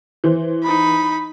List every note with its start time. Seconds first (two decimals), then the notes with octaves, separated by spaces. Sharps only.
0.24 E3 C5
0.63 D#4 B5